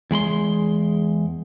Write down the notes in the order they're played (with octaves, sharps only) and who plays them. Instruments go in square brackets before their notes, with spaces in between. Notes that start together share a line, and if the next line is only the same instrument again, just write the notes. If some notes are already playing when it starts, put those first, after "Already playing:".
[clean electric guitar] E2 G#3 B5 C6